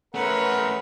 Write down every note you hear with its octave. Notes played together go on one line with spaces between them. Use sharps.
A3 C#4 A#4 B4 C#5 F#5